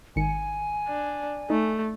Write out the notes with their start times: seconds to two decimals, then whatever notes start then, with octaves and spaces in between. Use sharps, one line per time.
0.16 G#1 D#3 G#5 C#7
0.88 D4
1.50 A3 D#4